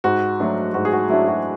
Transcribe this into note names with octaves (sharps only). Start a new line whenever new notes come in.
G#2 F#4
F#3 A3 D4
G#2 F#4
G#4
F#4
F#3 A3 D4 E4
F#4